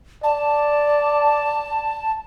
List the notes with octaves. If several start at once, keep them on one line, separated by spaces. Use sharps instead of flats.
D5 A5